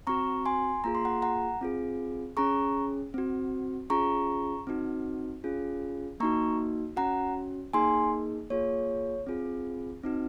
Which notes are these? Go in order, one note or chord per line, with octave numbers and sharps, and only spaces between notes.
C4 F#4 A#5 C#6
G#5 C6
A#3 F4 G#4 A#5
C6
F#5 A#5
F#5 A#5
C4 F4 G#4
C#4 G#4 A#5 C#6
C4 F#4
C#4 F4 G#4 A#5 C#6
C4 D#4 F#4
C#4 F4 G#4
A#3 D#4 F#4 A#5 C#6
C#4 F#4 F#5 A#5
A#3 D#4 G#4 G#5 C6
A#3 F4 G#4 C#5
C4 F4 G#4
C4 D#4 F#4